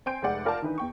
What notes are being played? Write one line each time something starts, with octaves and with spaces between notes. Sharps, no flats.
C4 G5 G#5 C6 G6 D7
F1 G#3 D5 F#5
F4 A#4 D5 F5 A5
D#3 E3 D4 D#4 B4
E2 G5 C#6